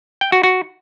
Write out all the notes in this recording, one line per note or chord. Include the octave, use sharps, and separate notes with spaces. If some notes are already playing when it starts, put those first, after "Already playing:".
G5
F#4
F#4